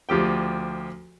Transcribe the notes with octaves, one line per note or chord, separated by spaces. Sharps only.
D2 F3 G4 G5